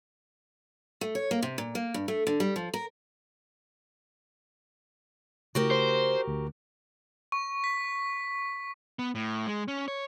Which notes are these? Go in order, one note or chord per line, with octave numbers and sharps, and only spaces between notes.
A3
C#5
A#3
C3
A#2
A#3
G2
A3
D3
G3
F3
A#4
C#3 A3 F#4 G4 A#4
C5
D2
C#6
B6
B3
A2
G#3
C#4
C#5